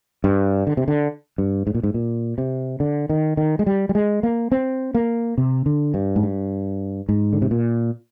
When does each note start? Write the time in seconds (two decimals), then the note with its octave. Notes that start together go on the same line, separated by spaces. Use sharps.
0.24 G2
0.67 D3
0.77 C3
0.88 D3
1.38 G2
1.67 G#2
1.75 A#2
1.83 G#2
1.94 A#2
2.38 C3
2.80 D3
3.10 D#3
3.37 D#3
3.59 G#3
3.66 G3
3.89 G3
3.95 G#3
4.23 A#3
4.52 C4
4.95 A#3
5.38 C3
5.66 D3
5.94 G2
6.16 G#2
6.23 G2
7.09 G#2
7.33 D3
7.42 C3
7.51 A#2